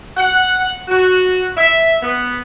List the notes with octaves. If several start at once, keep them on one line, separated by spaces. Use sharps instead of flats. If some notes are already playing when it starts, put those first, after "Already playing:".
F#5
F#4
E5
B3